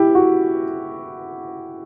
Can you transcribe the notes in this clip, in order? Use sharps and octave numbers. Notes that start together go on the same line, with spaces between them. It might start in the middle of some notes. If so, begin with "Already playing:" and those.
Already playing: E4 G4
F#4